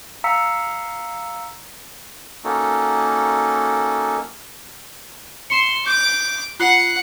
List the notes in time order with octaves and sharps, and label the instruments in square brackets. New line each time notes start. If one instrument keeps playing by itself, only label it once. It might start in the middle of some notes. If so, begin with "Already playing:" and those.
[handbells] F5 A#5 E6 B6 C#7
[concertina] A#3 C#4 D#4 F#4 A4
[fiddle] C6 [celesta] C#7 E7
[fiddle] D6 [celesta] G6
[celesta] F4 F#6 C7 [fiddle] F#5